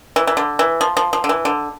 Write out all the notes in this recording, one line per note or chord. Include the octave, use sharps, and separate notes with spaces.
E3
E3
D3
E3
F3
F3
F3
D3
E3
D3